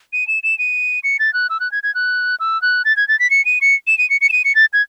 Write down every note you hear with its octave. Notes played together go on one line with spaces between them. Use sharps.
D#7
E7
E7
D#7
C#7
A6
F#6
E6
F#6
G#6
G#6
F#6
E6
F#6
A6
G#6
A6
B6
C#7
D#7
C#7
E7
D#7
C#7
C#7
E7
D#7
C#7
A6
G#6